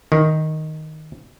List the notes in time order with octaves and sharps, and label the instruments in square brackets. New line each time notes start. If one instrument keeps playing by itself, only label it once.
[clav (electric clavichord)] D#3